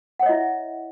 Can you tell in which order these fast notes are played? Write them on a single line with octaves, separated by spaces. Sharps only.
F#5 C#5 D#5 E4 E5